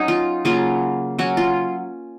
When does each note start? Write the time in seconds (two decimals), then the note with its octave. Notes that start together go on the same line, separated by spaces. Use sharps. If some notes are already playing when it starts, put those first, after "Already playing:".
Already playing: F#3 C#4 D#4
0.08 F4
0.45 C#3 F#3 A#3 C#4 F4
1.19 F#3 C#4 F#4
1.37 F4